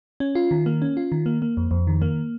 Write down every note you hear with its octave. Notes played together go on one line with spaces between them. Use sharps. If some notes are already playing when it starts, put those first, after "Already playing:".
C#4
F4
D#3
A#3
C#4
F4
D#3
A#3
A#3
F2
F2
D#3
A#3